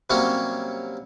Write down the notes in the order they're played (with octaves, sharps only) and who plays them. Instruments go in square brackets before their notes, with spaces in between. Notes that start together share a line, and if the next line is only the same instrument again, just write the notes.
[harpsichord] C3 F#3 G3 A#3 C4 C#4